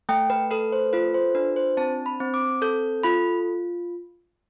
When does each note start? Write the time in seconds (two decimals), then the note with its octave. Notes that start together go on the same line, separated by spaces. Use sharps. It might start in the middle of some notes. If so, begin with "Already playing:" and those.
0.09 A3 G5
0.30 B4
0.51 A4 B4
0.72 C5
0.93 F4 B4
1.14 C5
1.35 D4 B4
1.56 C5
1.77 C4 A5
2.06 B5
2.20 C4
2.34 D6
2.62 A4 G6
3.04 F4 B5